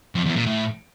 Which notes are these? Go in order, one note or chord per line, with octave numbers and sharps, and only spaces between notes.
F2
E2
A#2
A2